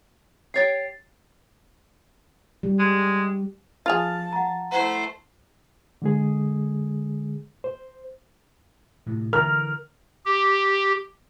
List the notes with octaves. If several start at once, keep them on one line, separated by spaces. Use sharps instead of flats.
G4 C#5 G5 A6 C7
G3
G#3
F3 F4 G#4 A5 F6 F7
F#5 A#5
A3 E4 C5 F#5 A#5
D3 G#3 G#4
C5
A2 C3
D3 E3 A#4 F6
G4